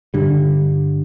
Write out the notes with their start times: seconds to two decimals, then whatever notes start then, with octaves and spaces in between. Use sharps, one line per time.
0.14 G2 D3 G3